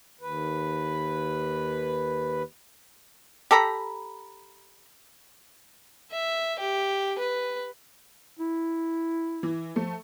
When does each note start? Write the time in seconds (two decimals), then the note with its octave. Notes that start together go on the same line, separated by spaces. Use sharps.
0.21 D#2 B4
3.51 G4 A4 A#5 B5
6.12 E5
6.59 G4
7.19 B4
8.39 E4
9.43 E3
9.76 F3 A3